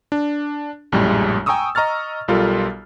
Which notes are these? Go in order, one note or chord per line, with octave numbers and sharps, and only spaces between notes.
D4
A#1 F#2 A2 G3 G#3
G5 G#5 A#5 C#6 D#6 E6
D#5 A#5 C#6 F6 A6
B1 G3 F4 A4 A#4